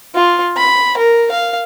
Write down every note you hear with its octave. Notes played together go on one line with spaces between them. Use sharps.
F4
B5
A#4
F5